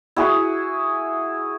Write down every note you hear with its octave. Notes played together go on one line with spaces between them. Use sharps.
E4 F#4 G#4